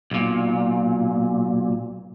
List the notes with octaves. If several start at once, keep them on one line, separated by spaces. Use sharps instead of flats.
B1 A#2